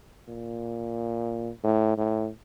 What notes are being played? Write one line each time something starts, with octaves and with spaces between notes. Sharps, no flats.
A#2
A2
A2